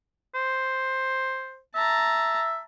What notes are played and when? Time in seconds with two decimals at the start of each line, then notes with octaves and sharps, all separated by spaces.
0.35 C5
1.75 E5 A5 A#5